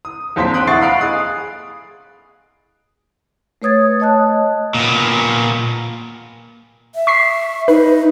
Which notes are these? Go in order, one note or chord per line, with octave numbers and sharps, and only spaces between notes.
D#6
A#1 D#2 C4 C5 G5 B6
C6 D#6 F#6 D7
E4 F#5 C#6 A6 C7
D#5 F5 B5 F#6 C7 D7
G#4 D#6
A3 B4 C#5 D#6 G#6 A6
C#5 D#5 A5 D#6 F#6
A#2 B3
E5
C#6 B6 C7
D#4 B4